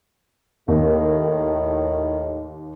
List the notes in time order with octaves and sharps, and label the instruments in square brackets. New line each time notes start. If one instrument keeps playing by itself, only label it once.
[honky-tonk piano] D#2 [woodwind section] A2 D#3